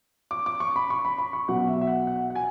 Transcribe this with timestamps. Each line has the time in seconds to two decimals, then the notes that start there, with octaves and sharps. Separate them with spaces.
0.31 D6
0.46 D6
0.60 C#6
0.76 B5
0.90 C#6
1.05 B5
1.18 B5
1.33 C#6
1.48 B1 B2 F#3 F#5
1.67 E5
1.81 E5
1.87 F#5
2.07 F#5
2.30 F#5
2.35 G#5